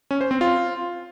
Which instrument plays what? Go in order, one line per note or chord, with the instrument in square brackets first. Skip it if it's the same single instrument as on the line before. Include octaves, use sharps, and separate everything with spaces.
[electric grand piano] C#4
C5
C4
F4